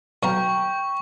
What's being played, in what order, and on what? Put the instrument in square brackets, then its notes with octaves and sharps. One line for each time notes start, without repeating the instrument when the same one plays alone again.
[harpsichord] B1 F5 A#5 [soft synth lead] G5 [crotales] C#6